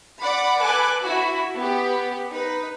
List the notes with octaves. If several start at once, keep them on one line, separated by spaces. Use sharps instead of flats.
D5 F#5 B5 D6
A4 B4 G#5 D6 F#6
E4 F#4
B3 G4
D#4 B4